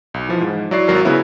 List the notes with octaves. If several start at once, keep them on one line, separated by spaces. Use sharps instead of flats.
B1
E3 F3
G#2
F#3 E4 D5 C#6 C7
G#1 F#3 A#4 C7
C#3 F#3 B3 E4